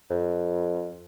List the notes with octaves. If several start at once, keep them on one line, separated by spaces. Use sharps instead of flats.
F2